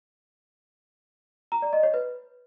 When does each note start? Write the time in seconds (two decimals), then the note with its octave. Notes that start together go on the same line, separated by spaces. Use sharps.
1.52 A#5
1.62 D5
1.73 D#5
1.83 C#5
1.94 B4